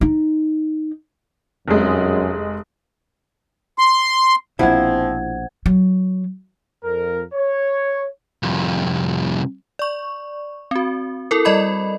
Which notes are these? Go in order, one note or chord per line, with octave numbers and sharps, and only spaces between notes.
D#4
F1 F#2 G#3
C6
A#1 B2 F3 C4 E4 C5 F#5 G#6
F#3
F2 A#4
C#5
C2 F2
D5 C#6
C4 F#4
E4 A4 A#4
G3 D5 D#5 B5